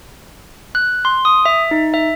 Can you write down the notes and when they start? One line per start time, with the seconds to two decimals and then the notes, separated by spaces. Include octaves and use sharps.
0.75 F#6
1.05 C6
1.25 D#6
1.45 E5
1.71 D#4
1.94 E5